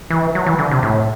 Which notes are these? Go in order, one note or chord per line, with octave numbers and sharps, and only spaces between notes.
E3
F#3
E3
D3
C3
A2